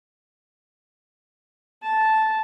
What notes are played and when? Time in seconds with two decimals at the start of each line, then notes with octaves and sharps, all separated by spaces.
1.83 A5